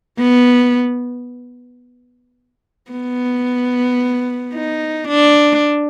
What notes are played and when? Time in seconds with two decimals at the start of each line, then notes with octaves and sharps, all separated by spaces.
0.19 B3
2.91 B3
4.54 D#4
5.08 D4